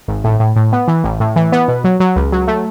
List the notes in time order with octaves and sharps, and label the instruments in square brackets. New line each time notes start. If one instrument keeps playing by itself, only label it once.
[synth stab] G#1
A2
A2
A2
B3
E3
A1
A2
E3
B3
B2
F#3
F#3
C#2
F#3
A3